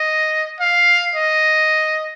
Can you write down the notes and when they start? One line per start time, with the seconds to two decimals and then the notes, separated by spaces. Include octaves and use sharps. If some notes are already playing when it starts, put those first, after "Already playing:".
Already playing: D#5
0.60 F5
1.15 D#5